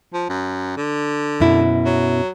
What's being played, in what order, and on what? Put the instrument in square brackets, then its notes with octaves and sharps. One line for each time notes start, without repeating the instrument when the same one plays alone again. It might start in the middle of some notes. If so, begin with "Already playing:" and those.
[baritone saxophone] F3
F#2
D3
[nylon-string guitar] F#2 B2 E4
[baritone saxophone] F#3